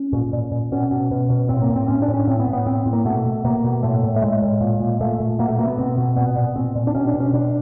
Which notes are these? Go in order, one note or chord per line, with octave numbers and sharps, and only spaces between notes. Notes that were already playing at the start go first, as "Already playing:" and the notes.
Already playing: C#4
A#2
A#2
A#2
B2 C#4
B2
B2
B2
A2 C4
A#3
A2
C4
A2 C#4
D4
A2
C#4
A2 C4
B3
A2
B3
A2 C4
A2
A#3
B2 A3
B2
B2 A#3
B2
A2 A3
A2
A3
A2 G#3
A2
A#2
A#2
A#2 A3
A#2
B2 A#3
A3
B2 A#3
B3
B2 C4
B2
A#2 B3
A#2
A#2 C4
A#2
D4
B2 C#4
D4
B2
C#4
B2 D4